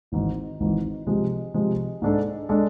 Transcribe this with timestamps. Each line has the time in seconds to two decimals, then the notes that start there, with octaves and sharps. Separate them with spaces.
0.12 G#1 G#2 E3
0.60 G#1 G#2 E3
1.07 C3 F3 G#3
1.54 C3 F3 G#3
2.02 G#2 G#3 D4 A4
2.49 G#3 D4 A4